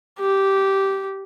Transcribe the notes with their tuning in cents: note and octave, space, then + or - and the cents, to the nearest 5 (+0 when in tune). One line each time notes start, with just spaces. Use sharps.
G4 -10